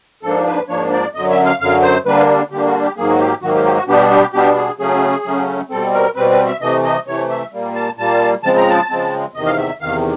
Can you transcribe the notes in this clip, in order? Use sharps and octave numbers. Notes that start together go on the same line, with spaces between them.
G#2 F3 A#3 D4 A4
B4
G#2 F3 A#3 D4 C#5
D5
F#2 D3 F#3 D#5
E5
F5
F#2 D3 F#3 F5
C5
D3 G3 A#3 D4 B4
D3 G3 A#3 D4 G4
F#4
G4
G#2 D#3 F#3 A#3 G#4
F#4
G4
G#2 D#3 F#3 A#3 F#4
G4
G4
F#4
B2 G3 B3 D4 G4
G4
B2 G3 B3 D4 G4
G#4
C#3 F#3 A3 C#4 G#4
C#3 F#3 A3 C#4
B2 G3 C4 A4
A#4
B2 G3 C4 B4
B4
E5
C3 E3 A3 D#5
D#5
C3 E3 A3 C#5
E5
A#2 G3 A#3
A5
A#2 G3 A#3 A5
C#3 F3 G#3 C4 A5
A#5
A5
C#3 F3 G#3 C4
E2 C3 D#3 D#5
F5
E5
E2 C3 D#3 F5